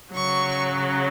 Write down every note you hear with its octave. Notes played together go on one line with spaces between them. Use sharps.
C#3 F#3 C#6